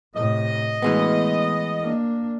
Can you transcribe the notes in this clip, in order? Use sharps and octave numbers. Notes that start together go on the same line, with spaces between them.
A2 C3 D#5
E3 G#3 A3 B3
A#3 D4